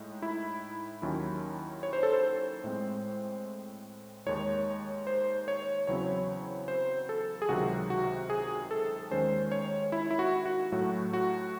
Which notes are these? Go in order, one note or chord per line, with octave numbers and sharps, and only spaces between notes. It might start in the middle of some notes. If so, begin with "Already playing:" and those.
Already playing: A2 G#3 D#4
E4
D#2 D#3 F#3 C#4 E4
C#5
C5
A4
C5
A2 G#3 C4
D#2 D#3 G#3 D#4 C#5
C5
C#5
E2 C#3 F#3 C4 E4 C#5
C5
A4
G#4
C#2 C3 D#3 F#3 C4 F#4
F#4
G#4
A4
D#2 D#3 G#3 C#4 C5
C#5
E4
E4
F#4
F#4
A2 F#3 A3 F#4
F#4